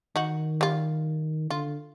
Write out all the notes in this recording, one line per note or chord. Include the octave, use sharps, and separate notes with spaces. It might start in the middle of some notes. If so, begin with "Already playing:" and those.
D#3 D#4 F#4
G3 F4
D3 F4